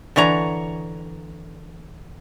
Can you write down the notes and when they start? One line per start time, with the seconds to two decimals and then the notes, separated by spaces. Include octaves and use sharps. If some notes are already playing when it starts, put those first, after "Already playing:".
0.16 D3 E3 C#5 A#5